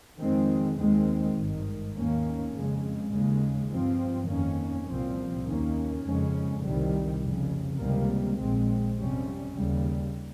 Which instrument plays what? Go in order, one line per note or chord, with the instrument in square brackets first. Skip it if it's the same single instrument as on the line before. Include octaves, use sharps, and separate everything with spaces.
[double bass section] F2 D#3 G#3 C4
D#2 D#3 G#3 C4
G#1 G2 D#3
D#2 D#3 A#3 C#4
F2 C#3 G#3
D#2 C#3 G#3
G2 F3 C4
F2 D#3 A#3 C#4
C2 A#2 F3 C4
D#2 D#3 A#3 C#4
F2 C#3 G#3 C#4
C2 C3 D#3 G3
F1 F2 C#3
C#2 C3 D#3 G3 A#3
A#1 A#2 G#3 C4
F2 C3 G3 C#4
D#2 C#3 G3